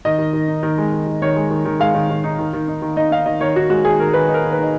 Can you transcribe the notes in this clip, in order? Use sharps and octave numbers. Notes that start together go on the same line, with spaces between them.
D#3 D#5
D#3
D#3
D#4
D#3
G#3
D#3
D#3
D#3 C#5
G#3
D#3
D#3
G#3 F5
D#3
D#3
D#4
D#3
D#3
D#4
D#3
D#4 D#5
D#4 F5
D#3 D#5
D#3 C#5
D#3 F#4
G#3 F#4
D#3 G#4
D#3 A#4
D#3 B4
D#4
A#4
D#3
B4
D#4 D#5